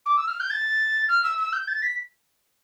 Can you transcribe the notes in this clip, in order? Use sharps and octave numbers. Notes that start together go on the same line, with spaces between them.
D6
E6
F6
G6
A6
F6
E6
E6
G6
A6
B6